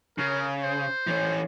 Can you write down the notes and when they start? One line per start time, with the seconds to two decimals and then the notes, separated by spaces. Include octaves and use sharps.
0.18 C#3 A#4
0.63 C5
1.07 E3 C#4